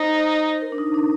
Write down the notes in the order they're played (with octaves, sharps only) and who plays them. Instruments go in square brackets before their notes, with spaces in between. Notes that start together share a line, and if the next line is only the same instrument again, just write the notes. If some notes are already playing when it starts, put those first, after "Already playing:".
Already playing: [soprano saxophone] D#4 [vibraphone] C5
[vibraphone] A#4
D4
D#4
D4